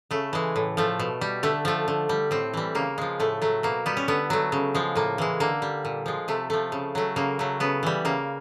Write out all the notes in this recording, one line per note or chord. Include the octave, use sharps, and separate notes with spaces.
C#3 A3
E3 G#3
A2
F3 A3
B2
G3
D3 A3
F3 A3
D3
G3
A2 C4
E3 G3
C#3 A#3
F3 G#3
A2 A3
F#3 A3
B2 A#3
G3 B3
C#4
D3 B3
F#3 A3
C#3
F3 G#3
A2 A#3
E3 G#3
D3 A#3
G3
A#2
F3 G#3
C3 A3
F3 A3
C#3
F#3 A3
C#3 A#3
F#3 A3
C#3 B3
E3 G3
C#3 A#3